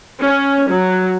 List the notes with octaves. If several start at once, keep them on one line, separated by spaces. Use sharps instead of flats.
C#4
F#3